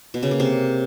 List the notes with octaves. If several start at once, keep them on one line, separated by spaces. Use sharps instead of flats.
B2
C#3
A#3
C3